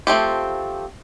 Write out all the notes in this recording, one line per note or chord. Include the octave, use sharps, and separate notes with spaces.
F3 A3 C4 G4